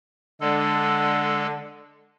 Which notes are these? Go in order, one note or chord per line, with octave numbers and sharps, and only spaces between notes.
D3 G#3 A4